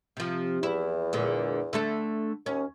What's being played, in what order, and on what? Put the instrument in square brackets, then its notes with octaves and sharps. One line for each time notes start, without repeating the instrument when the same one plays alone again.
[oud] C3 F3
[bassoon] E2 [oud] E4
[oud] A#2 D3 G#3
D3 A3 A4
[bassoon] D#2 [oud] C#4